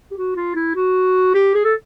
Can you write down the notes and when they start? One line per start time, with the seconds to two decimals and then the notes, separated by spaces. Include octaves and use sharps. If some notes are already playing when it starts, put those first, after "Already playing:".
0.11 G4
0.17 F#4
0.36 F4
0.55 E4
0.75 F#4
1.34 G4
1.54 G#4
1.64 A4